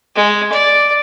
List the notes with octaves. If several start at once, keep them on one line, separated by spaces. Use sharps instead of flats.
G#3
D5